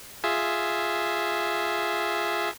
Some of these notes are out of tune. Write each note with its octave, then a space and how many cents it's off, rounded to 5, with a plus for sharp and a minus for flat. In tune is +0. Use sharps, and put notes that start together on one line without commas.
F4 +0 G#4 +0 E5 +0